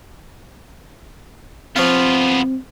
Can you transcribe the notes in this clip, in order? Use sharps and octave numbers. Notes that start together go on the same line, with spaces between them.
F3 B3 C4 F4 C#5 F5